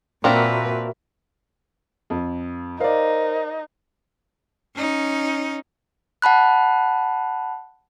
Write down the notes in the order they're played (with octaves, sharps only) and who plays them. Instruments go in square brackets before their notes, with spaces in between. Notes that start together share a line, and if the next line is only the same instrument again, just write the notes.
[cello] A#2 B4 [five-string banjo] A#3 C4 D4 [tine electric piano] F#4 A#4 E5
[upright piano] F2
[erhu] D#4 [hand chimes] A#4 C5 [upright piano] D5 F5
[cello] C#4 D#4
[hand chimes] F#5 A5 B5 F#6